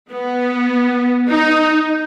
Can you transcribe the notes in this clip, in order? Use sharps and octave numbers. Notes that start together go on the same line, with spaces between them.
B3
D#4